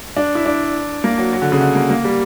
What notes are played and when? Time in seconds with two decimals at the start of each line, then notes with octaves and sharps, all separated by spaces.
0.16 D4
0.35 E4
0.46 D4
1.04 A#3
1.18 F#3
1.33 F#3
1.42 D3
1.52 C#3
1.61 D3
1.75 A#3
1.90 A#3
2.04 G3